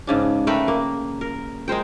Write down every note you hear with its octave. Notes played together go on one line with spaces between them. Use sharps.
G#2 C#3 D4
A3 A#4 B4 G5
A#3
A#4
G#3 A#4 C5 G5